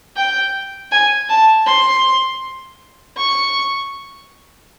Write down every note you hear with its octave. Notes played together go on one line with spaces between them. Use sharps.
G5
G#5
A5
C6
C#6